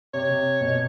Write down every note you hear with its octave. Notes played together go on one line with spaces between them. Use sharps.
C3 C#5
C3
B2